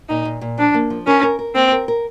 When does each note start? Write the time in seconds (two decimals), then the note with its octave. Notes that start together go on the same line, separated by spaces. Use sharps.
0.09 A#2 D#4
0.25 A#2
0.41 A#2
0.58 F3 D4
0.74 A#3
0.90 F3
1.07 C#4 A#4
1.23 A#4
1.39 A#4
1.55 A#3 C4
1.72 A#4
1.88 A#4